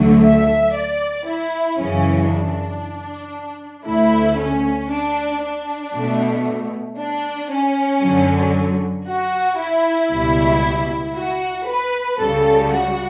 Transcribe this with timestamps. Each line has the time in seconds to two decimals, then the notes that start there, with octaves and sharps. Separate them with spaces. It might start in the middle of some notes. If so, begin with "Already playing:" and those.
Already playing: D2 D3 F#3 A3
0.21 E5
0.73 D5
1.26 E4
1.77 F#2 C#3 E3 C#4
2.29 D4
3.85 D2 D3 A3 E4
4.38 C#4
4.90 D4
5.42 D4
5.94 B2 A3
6.98 D4
7.50 C#4
8.02 F#2 D3 F#3
9.07 F#4
9.58 E4
10.11 C#2 B2 G3
11.15 F#4
11.67 B4
12.19 C#2 C#3 G3 A4
12.72 F#4